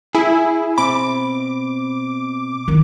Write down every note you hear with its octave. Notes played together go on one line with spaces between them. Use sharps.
E4 G#4
B2 C4 B5 D6
D#3 E4